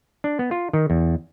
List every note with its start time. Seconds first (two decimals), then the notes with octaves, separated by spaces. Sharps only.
0.24 D4
0.39 B3
0.51 F4
0.73 D#3
0.90 E2